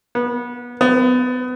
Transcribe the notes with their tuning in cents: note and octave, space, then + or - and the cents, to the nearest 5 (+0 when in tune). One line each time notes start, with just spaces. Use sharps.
B3 -25
B3 +30